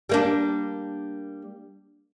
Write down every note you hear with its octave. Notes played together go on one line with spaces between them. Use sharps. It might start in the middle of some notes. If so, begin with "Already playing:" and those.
G3 A#3 D4